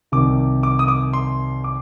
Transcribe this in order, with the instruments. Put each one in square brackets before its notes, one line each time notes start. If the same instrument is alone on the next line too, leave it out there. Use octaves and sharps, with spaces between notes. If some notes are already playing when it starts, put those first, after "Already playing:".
[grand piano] C2 C3 D#3 D6
D6
D#6
D6
C6
D6